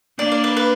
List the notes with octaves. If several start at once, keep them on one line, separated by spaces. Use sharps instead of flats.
A#3 D4 D5
D5
B4
B4